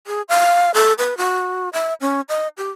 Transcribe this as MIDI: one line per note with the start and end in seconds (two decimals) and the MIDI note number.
0.07 0.22 68
0.29 0.71 77
0.74 0.93 69
0.99 1.17 71
1.18 1.69 66
1.73 1.94 76
2.01 2.21 61
2.29 2.48 75
2.57 2.71 67